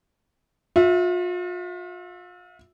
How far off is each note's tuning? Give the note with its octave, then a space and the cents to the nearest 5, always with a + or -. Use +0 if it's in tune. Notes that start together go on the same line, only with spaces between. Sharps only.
F4 +40 E5 +0